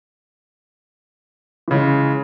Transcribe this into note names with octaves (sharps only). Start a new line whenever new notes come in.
C#3 E3 G#3